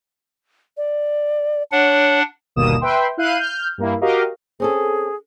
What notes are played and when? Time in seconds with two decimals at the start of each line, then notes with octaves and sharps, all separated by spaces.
0.77 D5
1.72 D4 C#5 F#5
2.56 G1 D#2 B2 A#3 D#6 E7
2.81 B4 E5 G5 C6
3.17 E4 F5 F#6 G6 C7 D#7
3.38 F6 G6
3.78 G2 A#3 E4
4.01 F#4 G4 A#4 D#5 F5
4.60 C4 C#4 G#4 A4